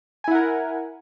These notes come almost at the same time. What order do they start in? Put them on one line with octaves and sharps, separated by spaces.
G#5 E4 F#5 A#4